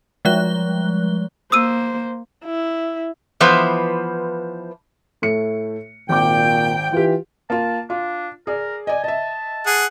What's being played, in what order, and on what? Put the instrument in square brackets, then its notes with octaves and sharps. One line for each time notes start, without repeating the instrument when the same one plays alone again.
[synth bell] F3 G3 G#3 F#6 G7
[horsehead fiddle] A#3 C5 [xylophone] D#6 E6 D#7
[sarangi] E4
[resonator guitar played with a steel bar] E3 F3 B3 B4 C5
[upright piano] A2 A3 C#7
[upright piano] G#1 D6 [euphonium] A#2 [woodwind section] G5
[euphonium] E3 [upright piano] F4 G4
[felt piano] A#3 F4 [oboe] A5
[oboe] D4 [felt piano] F4
[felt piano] G#4 D5 [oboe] A#4
[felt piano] D5 D#5 [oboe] G#5
[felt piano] D#5 E5 [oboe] A5
[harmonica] G#4 F#5